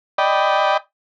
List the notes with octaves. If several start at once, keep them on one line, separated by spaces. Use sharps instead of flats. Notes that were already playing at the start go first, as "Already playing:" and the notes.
D5 D#5 G5 B5